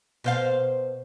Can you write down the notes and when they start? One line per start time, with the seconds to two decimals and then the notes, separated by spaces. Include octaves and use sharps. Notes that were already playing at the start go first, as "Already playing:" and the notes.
0.24 B2 C5 F5